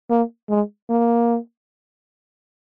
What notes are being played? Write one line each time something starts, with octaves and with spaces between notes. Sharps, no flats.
A#3
G#3
A#3